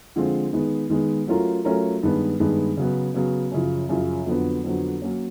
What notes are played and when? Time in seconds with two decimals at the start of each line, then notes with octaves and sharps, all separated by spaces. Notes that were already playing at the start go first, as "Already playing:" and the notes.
0.16 D3 F3 G#3 C4 F4
0.53 D#3 G#3 B3
0.90 D#3 G#3 B3
1.27 F#3 A3 C#4 F4 A#4
1.65 F#3 A3 C#4 F4 A#4
2.03 G2 D#3 G#3 B3
2.40 G2 D#3 G#3 B3
2.77 C#3 F#3 B3
3.14 C#3 F#3 B3
3.51 F#2 C#3 F3
3.89 F#2 C#3 F3
4.26 F2 D3 F#3 B3
4.64 F2 D3 F#3 B3
5.02 F#3 A#3 C#4